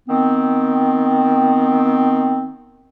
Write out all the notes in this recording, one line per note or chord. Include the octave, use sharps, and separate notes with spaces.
D#3 B3 C4